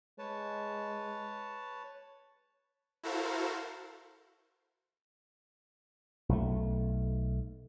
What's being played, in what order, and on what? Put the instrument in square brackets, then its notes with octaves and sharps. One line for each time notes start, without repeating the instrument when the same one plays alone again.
[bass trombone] G#3 [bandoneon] B4 C#5 A5
[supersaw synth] E4 F#4 A4 A#4 C5 F5
[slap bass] B1 A3